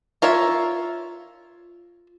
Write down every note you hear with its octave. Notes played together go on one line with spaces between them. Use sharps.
F4 A#4 C#5 E5